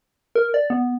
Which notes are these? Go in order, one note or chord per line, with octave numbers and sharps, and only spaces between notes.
A#4
D5
B3